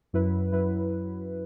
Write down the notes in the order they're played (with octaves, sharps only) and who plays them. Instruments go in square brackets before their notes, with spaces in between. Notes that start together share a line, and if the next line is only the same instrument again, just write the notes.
[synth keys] F#2 F#3 E4 B4
F#2 F#3 E4 B4